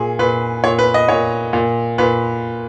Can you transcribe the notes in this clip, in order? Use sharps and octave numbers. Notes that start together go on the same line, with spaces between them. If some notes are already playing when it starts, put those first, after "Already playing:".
Already playing: A#2 G#4
A#2 B4
A#2 C#5
B4
D#5
A#2 C#5
A#2
A#2 B4